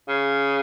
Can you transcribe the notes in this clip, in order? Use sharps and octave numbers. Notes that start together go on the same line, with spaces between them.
C#3